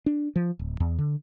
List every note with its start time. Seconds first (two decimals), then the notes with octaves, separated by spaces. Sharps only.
0.06 D4
0.36 F3
0.59 D1
0.80 E2
0.98 D3